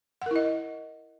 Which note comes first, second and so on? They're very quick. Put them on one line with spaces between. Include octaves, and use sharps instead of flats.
F#5 A#4 E4 D#5